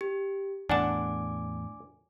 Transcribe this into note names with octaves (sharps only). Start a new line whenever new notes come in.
G4
E2 A2 D4 F#5 G#5 A5 D6